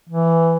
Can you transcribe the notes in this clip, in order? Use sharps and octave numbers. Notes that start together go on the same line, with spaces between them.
E3